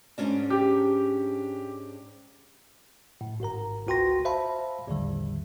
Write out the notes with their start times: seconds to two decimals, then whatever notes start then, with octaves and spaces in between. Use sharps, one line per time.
0.18 G#2 C#4 D4
0.50 G4
3.21 A2
3.40 G#1 G#2 A#4 A#5
3.87 G1 C#2 F#4 G5 C6 A#6
4.25 C5 E5 F5 A5 B5
4.87 A#1 E2 A2 D3 D#3 G3